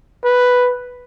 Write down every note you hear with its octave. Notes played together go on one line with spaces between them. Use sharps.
B4